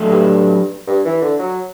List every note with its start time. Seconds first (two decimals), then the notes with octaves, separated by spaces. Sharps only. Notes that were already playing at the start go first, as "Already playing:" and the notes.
Already playing: A2 F#3 A3 D4 A4
0.09 G2
0.88 G2
1.05 E3
1.22 D3
1.39 F#3